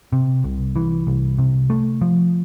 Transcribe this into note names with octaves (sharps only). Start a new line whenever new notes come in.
C3
C2
E3
C2
C3
A3
F3